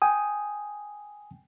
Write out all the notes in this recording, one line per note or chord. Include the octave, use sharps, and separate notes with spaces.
G5 G#5 D#6